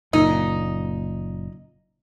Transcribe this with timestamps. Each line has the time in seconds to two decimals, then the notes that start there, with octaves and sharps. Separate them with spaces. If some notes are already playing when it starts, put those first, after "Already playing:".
0.13 F#1 A#2 D#4